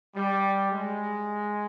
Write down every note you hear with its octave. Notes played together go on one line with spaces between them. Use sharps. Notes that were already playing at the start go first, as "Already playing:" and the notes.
G3
G#3